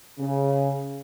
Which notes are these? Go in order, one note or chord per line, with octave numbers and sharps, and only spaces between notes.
C#3